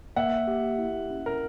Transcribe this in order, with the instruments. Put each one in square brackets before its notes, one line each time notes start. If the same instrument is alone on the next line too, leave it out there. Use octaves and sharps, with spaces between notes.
[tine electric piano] A#3 [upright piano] E5 F#5
[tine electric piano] G4
E4
C#4
[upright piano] A#4